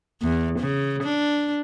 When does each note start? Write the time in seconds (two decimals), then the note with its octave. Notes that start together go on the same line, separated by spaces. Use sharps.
0.22 E2
0.59 C#3
1.04 D4